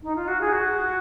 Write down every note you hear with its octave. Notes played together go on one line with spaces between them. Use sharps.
D#4
F4
F#4
G#4
F#4